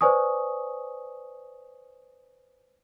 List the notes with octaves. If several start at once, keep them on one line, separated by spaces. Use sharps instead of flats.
B4 C5 D5 G#5 C#6 D#6